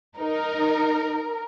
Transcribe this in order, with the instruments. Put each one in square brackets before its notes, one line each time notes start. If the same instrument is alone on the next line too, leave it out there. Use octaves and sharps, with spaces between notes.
[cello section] D#4 [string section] A#4